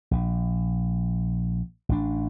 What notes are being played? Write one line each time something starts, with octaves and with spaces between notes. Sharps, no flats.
A#1
A1 D4